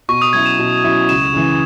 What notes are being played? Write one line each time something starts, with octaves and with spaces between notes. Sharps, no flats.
B2 C#6
D#6
F#3 C#4 E4 G#6
E7
B2
F#3 C#4 E4
C#2 E7
C#3 E3